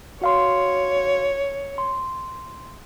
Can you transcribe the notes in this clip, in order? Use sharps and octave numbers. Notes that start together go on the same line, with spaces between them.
F#4 C#5 F5 C6
C6